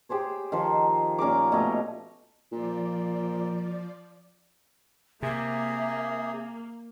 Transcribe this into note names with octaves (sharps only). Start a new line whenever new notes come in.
G4 G#4 C5 C#5
D#3 F3 C5
A#2 C#4 A#4 D6
B2 A3 C#5 D#5
A#2 F3 D5
C3 A#3 G#4 E5